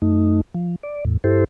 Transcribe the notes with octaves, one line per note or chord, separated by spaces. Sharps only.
F#2 A3 D#4
F3
D5
E2 A2
G2 E4 G4 A4 C5